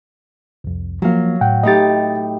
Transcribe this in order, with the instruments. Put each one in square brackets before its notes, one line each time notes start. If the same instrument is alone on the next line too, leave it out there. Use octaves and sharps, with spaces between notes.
[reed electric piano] C2 F2
[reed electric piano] F3 A#3 [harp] F#3 F5
[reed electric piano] A2 F#5 G5
[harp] A2 D#4 G4 [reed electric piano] D#5 A6